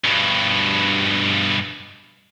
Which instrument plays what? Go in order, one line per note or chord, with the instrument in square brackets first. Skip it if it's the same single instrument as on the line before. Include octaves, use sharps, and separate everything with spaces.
[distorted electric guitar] G2 B2